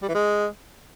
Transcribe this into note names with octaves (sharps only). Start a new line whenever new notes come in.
G3
E3
G#3